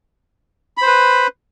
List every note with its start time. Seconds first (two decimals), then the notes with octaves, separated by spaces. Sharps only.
0.77 B5
0.82 C5
0.87 B4